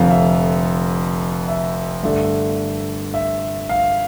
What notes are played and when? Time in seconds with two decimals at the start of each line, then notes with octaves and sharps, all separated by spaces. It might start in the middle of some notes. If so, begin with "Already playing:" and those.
Already playing: F1 F2 D3 F3 F5
0.10 E5
1.49 E5
2.03 G2 D3 A3 D4 E5
3.14 E5
3.69 F5